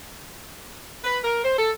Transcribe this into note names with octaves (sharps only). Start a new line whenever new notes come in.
B4
A#4
C5
A4